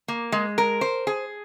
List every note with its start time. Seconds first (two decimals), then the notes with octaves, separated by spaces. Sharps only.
0.08 A#3
0.32 G#3
0.58 A#4
0.81 C5
1.07 G#4